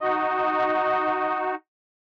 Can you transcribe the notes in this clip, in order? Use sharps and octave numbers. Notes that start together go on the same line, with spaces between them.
D#4 F#4 D#5